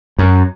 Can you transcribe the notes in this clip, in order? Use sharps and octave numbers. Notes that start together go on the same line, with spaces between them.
F#2